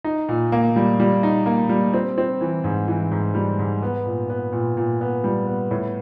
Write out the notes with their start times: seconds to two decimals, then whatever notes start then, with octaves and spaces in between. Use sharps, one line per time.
0.04 D#4
0.29 A#2
0.52 A#3
0.76 G3
1.00 G3
1.23 D#4
1.46 A#3
1.69 G3
1.94 C4
2.18 C4
2.41 E3
2.64 G#2
2.88 E3
3.11 G#2
3.35 G3
3.59 G#2
3.82 B3
4.06 A#2
4.30 B3
4.52 A#2
4.77 A#2
5.01 B3
5.24 G3
5.47 B3
5.71 A2